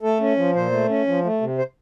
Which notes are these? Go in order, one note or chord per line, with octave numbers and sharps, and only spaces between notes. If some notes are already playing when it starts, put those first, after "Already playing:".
A3 A4
C#4
F3
A#2 C5
A3
C#4
F3
A3
C3
C5